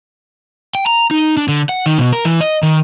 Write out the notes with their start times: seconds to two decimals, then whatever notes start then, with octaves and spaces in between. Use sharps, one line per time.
0.75 G5
0.86 A#5
1.11 D#4
1.37 D4
1.48 D3
1.69 F#5
1.86 D#3
1.98 B2
2.13 A#4
2.25 E3
2.41 D#5
2.63 D#3